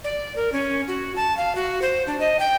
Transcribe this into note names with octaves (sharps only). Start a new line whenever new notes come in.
D5
A#4
C#4
F#4
A5
F5
F#4
C5
D4
D#5
G5